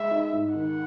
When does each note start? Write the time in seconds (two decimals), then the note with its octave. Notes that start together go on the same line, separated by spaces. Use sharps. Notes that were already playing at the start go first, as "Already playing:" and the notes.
Already playing: G#3 E5
0.11 D#4
0.33 G#2
0.54 D#3 F#5